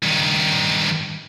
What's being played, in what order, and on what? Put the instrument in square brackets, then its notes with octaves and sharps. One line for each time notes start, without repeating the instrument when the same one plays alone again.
[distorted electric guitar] G2 D#3